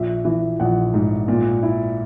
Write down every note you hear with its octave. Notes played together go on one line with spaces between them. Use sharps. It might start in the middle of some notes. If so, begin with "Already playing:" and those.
Already playing: A#1 E5
E3
A#1 F#5
G#2
A#2
E4